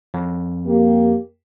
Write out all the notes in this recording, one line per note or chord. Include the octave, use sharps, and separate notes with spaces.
F2
A#3 G4